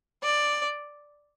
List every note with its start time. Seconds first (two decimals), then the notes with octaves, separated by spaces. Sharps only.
0.23 D5